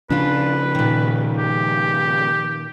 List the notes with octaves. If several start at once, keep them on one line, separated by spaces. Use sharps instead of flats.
C#3 F3 D4 F4 B4
A#2 D#3
G4